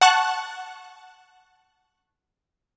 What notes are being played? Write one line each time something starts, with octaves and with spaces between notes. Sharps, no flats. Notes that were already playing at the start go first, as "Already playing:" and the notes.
F#5 A5 C#6 F#6